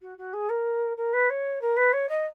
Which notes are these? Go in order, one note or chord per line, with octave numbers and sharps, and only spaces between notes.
F#4
F#4
G#4
A#4
A#4
B4
C#5
A#4
B4
C#5
D#5